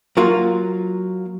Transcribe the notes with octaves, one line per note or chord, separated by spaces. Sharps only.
F#3 A#3 F4 F#4